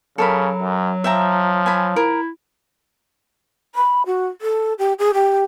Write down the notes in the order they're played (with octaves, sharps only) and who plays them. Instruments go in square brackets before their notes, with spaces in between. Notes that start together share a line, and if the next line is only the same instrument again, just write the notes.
[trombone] C#3 [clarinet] F#3 [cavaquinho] A4 A#4 B5
[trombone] F#2
[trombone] F3 [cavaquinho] E5 G5 A#5
[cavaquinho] G#5 A5 B5
[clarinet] E4 [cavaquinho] A#4
[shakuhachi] B5
F#4
A4
G4
G#4
G4